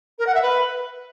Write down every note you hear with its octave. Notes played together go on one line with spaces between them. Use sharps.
A#4
F#5
E5
B4